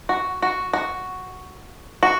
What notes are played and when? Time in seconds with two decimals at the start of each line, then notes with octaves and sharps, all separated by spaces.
0.09 F#4
0.42 F#4
0.73 F#4
2.03 F#4